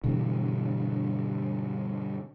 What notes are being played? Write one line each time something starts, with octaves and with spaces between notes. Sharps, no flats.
G2 B2 D3 E3